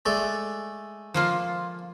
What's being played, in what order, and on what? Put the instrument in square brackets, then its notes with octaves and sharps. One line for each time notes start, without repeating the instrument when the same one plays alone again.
[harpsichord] G#3 A3 D5
[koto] F3 A#3 F4